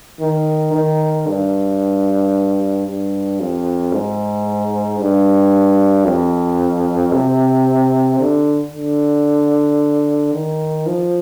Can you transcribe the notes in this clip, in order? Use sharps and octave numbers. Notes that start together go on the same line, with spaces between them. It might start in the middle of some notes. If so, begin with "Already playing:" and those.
D#3
D#3
G2
G2
F2
G#2
G2
F2
C3
D3
D3
D#3
F3